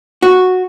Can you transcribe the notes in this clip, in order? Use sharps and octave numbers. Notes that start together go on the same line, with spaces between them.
F#4